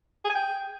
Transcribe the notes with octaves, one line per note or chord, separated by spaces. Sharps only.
G#4
G#5
G5